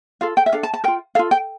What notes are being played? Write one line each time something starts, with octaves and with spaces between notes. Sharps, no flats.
F4 A4 F5
G5
E5
D4 A4 F5
A5
A5
F4 A#4 G5
F4 A4 F5
G5